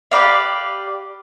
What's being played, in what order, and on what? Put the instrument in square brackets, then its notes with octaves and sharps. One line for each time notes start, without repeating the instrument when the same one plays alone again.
[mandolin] G4 B4 D5 F5